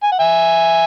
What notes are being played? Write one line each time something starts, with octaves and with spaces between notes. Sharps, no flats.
G#5
F#5
E5 G#5